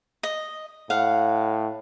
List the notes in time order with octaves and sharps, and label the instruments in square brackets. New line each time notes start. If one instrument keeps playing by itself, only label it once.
[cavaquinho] D#5
[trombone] A2 [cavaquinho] F5 F#5